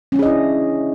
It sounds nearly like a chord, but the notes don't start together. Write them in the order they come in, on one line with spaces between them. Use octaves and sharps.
C#4 D4 G#4 D#5 E4